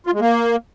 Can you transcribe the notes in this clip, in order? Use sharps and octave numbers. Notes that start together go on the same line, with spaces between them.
F4
G#3
A#3